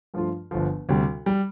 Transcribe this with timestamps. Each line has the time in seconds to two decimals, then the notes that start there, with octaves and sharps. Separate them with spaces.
0.14 G2 F3 A3 F4
0.51 G1 G2 D3 F3
0.89 D2 C3 G3
1.26 G3